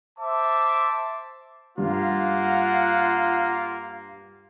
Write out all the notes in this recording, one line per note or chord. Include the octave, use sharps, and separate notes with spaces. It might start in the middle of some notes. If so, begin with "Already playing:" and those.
C5 E5 A5 D6
G2 G3 A#3 F4 F#5